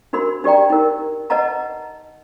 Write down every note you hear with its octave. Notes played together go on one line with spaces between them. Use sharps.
D4 F#4 A#4 B5
D4 G4 D5 G5 A#5
D#4 A#4
B4 D#5 F#5 A5 A#5